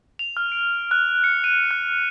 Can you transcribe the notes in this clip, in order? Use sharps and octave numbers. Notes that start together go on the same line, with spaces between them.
F7
F6
D7
F#6
C#7
D#7
F#6